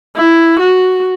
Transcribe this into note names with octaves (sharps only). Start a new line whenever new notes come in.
E4
F#4